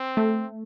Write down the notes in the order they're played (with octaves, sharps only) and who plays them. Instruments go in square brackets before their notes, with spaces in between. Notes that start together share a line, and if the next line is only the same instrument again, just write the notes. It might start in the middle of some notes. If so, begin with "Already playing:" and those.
Already playing: [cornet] C4
[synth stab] A3